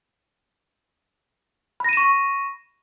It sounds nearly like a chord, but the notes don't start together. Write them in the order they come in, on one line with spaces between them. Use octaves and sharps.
B5 A#6 D#7 E7 C#6